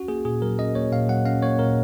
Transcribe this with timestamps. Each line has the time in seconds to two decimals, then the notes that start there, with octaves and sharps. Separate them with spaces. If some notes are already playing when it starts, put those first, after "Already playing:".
Already playing: C#4 F#4
0.08 A#3 G#4
0.25 A#2 G#4
0.42 F#3 A#4
0.59 C#4 D#5
0.75 A#3 C#5
0.92 A#2 F5
1.09 F#3 F#5
1.25 C#4 F5
1.42 A#3 C#5
1.59 A#2 A#4